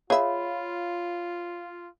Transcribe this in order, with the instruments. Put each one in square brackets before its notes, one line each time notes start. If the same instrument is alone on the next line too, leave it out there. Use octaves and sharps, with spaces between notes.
[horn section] F4 [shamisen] G#4 E5 [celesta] C#5 F5 B5